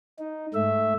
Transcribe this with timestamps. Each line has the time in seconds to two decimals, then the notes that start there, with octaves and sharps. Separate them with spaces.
0.19 D#4
0.54 G#2 A3 E5